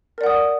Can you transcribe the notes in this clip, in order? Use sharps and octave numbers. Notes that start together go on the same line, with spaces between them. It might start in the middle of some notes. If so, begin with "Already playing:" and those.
A#4 D5 F#5 D#6